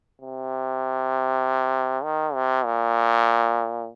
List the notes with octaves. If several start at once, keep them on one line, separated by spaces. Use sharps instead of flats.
C3
D#3
C3
A#2